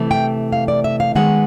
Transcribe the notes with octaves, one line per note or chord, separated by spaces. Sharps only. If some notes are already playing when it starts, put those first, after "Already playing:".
Already playing: C3 E3 A3
G5
F5
D5
E5
F5
D#3 G#3 B3 F#5